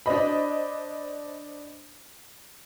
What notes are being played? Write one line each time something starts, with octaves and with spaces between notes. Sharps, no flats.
D4 C5 D#5 B5